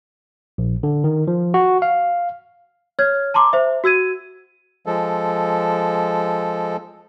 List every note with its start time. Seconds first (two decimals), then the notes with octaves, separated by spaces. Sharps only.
0.58 A#1
0.83 D3
1.04 D#3
1.28 F3
1.54 F#4
1.82 F5
2.99 C#5 F6 G#6
3.34 A5 A#5 C6 D6
3.53 C5 E5
3.84 F#4 E6 G#6 D#7
4.86 F3 G#3 A4